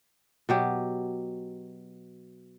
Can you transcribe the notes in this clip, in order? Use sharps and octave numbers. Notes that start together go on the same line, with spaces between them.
B2 F#3 G4